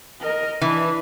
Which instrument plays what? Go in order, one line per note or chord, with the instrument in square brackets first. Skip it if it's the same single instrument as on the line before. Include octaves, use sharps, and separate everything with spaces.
[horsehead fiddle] A#4 D#5
[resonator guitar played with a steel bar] E3 [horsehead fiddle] D4 B4